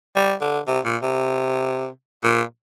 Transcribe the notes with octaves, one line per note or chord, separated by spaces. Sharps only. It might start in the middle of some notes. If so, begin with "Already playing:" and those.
G3
D3
C3
A#2
C3
A#2